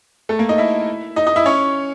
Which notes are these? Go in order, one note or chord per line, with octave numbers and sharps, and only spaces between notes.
A3 A4
A#3 A#4
D#4 D#5
E4 E5
D#4 D#5
D#4 D#5
E4 E5
C#4 C#5